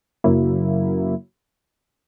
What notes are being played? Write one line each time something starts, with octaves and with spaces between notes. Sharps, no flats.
F#2 C#3 F#3 A#3 E4